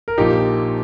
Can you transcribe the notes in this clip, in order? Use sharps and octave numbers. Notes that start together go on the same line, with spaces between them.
A#4
A#1 A#2 F3 D#4 G4